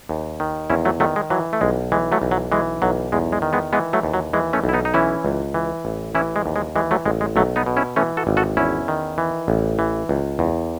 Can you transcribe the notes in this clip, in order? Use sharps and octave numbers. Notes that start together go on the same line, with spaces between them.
D#2
D#3
E2 C#4 E4
F#3 A3
D#3 F#3 A3
G#3
E3 F#3
A3
B1 G#3
E3 G#3
F#3 A3
B1
F#3
E3 G#3
B1 F#3
E2 G#3
G#3
D#3
G#3 B3
E3 G#3 B3
F#3 A3
D#2
F#3
E3 G#3
A3 C#4
B1
E4
B3 D#4
D#4
E3 C#4 E4
C#2
E3
A1
E3 C#4 E4
G#3
D#2
G#3
E3 G#3
F#3 A3
A1 G#3
G#3
B1 F#3 A3
B3 D#4
B2
C#4 E4
E3 A3 C#4
F#4 A4
G#1
F#4 A4
E2 C#4 E4
D#3
E3
A1
E3
C#2
E2